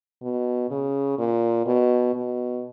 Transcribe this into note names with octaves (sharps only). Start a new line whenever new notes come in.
B2
C#3
A#2
B2
B2